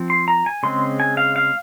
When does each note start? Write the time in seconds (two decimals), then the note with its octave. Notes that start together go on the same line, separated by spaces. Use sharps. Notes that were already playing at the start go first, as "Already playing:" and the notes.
Already playing: F3 C4
0.10 C6
0.28 A#5
0.46 G#5
0.63 C#3 G#3 C4 C6
1.00 G#5
1.17 F5
1.36 F5